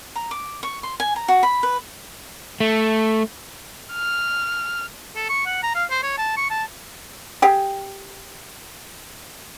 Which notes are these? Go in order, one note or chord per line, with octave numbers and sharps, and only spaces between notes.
A#5
D6
C#6
C6
G#5
A#5
F#4
B5
B4
A3
F6
A4
C#6
F#5
A#5
F5
C5
C#5
A5
C#6
A5
G4 G#4